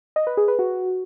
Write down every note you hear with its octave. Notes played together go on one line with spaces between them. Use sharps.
D#5
B4
G#4
B4
F#4